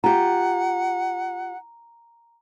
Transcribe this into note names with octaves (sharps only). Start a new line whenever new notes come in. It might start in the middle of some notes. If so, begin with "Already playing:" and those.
F4 G4 F#5 A#5